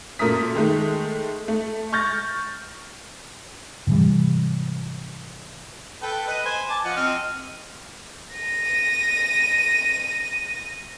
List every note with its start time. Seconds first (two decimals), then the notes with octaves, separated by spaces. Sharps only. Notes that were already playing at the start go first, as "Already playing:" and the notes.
0.19 F#2 A#2 A3 A#4 D#6 B6
0.55 D#3 G#3 A3
1.48 A3
1.93 C#6 F6 G6 A6 A#6
3.87 G#2 C3 E3 G3
6.02 A4 B4 G5
6.27 B4 D#5
6.45 C5 G#5
6.69 A5 D6
6.85 F3 D#5 F#5
6.96 C4 D#5 F6
8.35 A#6 D#7